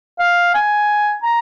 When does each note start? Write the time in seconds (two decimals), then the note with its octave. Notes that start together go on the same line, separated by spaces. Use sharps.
0.19 F5
0.54 G#5
1.23 A#5